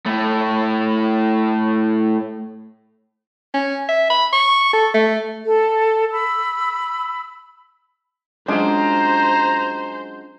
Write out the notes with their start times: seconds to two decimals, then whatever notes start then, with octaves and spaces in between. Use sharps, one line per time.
0.06 A2 A3
3.54 C#4
3.89 E5
4.10 B5
4.33 C#6
4.73 A4
4.94 A3
5.44 A4
6.12 B5 E6
8.48 F#3 G#3 C#4 D4 F4 C5 A#5